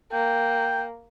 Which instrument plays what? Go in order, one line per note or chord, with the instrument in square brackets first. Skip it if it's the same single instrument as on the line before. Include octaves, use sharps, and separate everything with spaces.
[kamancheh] A#3 [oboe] G5